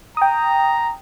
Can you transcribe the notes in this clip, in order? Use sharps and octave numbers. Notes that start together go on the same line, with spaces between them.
G5 A#5 D#6